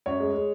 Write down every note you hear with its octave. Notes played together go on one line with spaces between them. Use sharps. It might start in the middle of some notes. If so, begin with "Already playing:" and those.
F#2 C#5
G#3
G#3